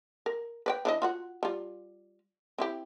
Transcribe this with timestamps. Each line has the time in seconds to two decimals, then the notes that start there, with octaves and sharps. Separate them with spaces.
0.26 A#4
0.66 B4 D5 G5
0.85 E3 D4 D#5
1.02 F4 F#4 F#5
1.43 G3 F4
2.58 C4 E4 G4